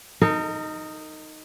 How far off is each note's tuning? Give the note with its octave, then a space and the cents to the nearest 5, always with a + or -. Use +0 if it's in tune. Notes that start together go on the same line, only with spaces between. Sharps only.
D#4 +0 A#4 -35